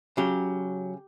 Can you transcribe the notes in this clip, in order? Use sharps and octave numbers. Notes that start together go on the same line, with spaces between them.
C#3 F#3 G4